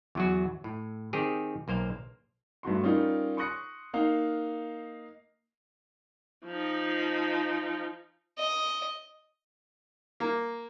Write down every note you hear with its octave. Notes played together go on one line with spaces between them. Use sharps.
E2 F#3 F#4
A2
D#3 C4 G4 G#4
B1 A#3 C5 F5
G2 A3 F#4 C6
G3 C#4 D#4 F4 A#4
C6 C#6 D#6 F#6 A#6 C#7
A#3 D#4 F5
F3 D#4
D#5
A#3